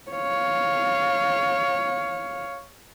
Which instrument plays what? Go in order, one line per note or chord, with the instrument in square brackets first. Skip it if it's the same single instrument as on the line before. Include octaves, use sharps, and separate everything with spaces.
[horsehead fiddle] C#5 F5